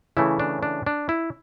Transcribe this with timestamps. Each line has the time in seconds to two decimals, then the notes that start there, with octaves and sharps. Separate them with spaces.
0.17 C#3 E3 A3 E4
0.40 D4
0.63 D4
0.86 D4
1.09 E4